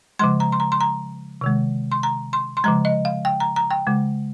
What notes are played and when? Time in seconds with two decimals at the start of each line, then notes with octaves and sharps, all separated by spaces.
0.19 C#3 F3 G#3 C6
0.40 A#5
0.52 C6
0.60 A#5
0.72 C6
0.81 A#5
1.41 C3 D#3 G#3
1.92 C6
2.03 A#5
2.33 C6
2.57 C6
2.64 C#3 F3 G#3 A#5
2.85 D#5
3.05 F5
3.25 G5
3.40 A#5
3.56 A#5
3.71 G5
3.87 C#3 G#3